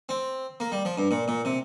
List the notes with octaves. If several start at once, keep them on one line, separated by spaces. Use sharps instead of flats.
C4
A#3
G3
F3
G2
A#2
A#2
C3